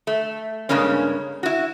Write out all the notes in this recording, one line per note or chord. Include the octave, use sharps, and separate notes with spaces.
A3
G2 C#3 G#3 A#3 C#4
E4 F#4